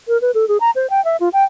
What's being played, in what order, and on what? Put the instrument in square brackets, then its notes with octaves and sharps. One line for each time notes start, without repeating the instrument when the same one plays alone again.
[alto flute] A#4
B4
A4
G#4
A#5
C5
G5
E5
F4
G5